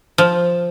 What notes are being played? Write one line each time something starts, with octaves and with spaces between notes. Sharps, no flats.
F3